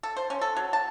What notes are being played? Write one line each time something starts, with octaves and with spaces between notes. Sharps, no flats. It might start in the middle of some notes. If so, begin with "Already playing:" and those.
A4
C5
C#4
A4
F#3
A5